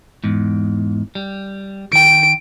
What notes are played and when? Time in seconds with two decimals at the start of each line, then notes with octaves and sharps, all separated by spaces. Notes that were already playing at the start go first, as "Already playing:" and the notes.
0.24 E2 G#2
1.15 G3
1.93 D#3 G5 D7